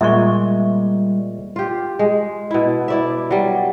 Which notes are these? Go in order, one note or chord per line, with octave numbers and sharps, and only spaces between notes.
A#2 G3 G#3 E5 C#6
F4 G4
G#3
B2 E4
E4 D5 E5
F#3 G3